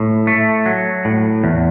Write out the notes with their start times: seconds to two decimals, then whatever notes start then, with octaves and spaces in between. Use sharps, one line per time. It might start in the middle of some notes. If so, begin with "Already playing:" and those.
Already playing: A2
0.27 A3
0.66 F#3
1.05 A2
1.44 E2